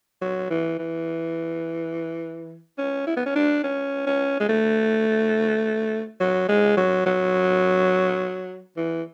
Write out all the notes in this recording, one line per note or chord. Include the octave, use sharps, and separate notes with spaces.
F#3
E3
E3
C#4
E4
B3
C#4
D4
C#4
C#4
G#3
A3
F#3
G#3
F#3
F#3
E3